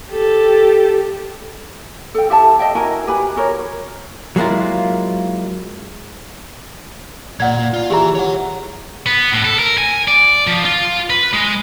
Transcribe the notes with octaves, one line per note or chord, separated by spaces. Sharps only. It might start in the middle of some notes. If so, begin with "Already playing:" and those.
G4 A4
A4 G5
E4 G4 E5 A5
D#5 E5 G5
E4 F#4 A#4 G#5
G4 B4 G#5 B5
E4 F#4 A#4 C#5
F#3 G#3 A#3 E4 F4
A#2 D5 F#5 G#6
F4
E3 G4 G#4 A#5
C#5 F#5
B3
A2
A4
A#4
G#5
D5
F3
F4
B4
G#3